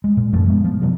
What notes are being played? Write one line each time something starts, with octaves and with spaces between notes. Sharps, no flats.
G#3
A#2
F#2 F3 A3
G#3 B3
F3
C3 F3 F#3 B3